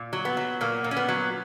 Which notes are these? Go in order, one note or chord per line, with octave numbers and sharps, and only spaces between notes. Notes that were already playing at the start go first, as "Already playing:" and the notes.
Already playing: A#2
F#3
B3
F#3
A#2 A#3
A#2
C#4
B3
F#3